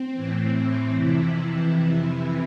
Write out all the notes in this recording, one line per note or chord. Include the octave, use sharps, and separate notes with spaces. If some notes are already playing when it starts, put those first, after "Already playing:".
Already playing: C4
A2 E3
A2 E3
F2 C3 E3 E4